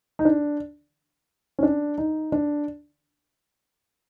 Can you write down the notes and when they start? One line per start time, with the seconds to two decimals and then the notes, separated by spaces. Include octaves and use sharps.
0.19 D#4
0.25 D4
1.59 C#4
1.63 D4
1.98 D#4
2.32 D4